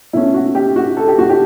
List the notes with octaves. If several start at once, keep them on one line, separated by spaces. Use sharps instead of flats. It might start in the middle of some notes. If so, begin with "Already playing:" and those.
B2 A3 C#4 E4
F#4
G4
F#4
A4
G4
F#4
G4